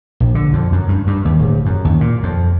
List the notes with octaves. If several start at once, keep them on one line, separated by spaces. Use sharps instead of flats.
A#1
D3
F2
F#2
G2
G2
D#2
D1
F#2
D#2
A#2
F2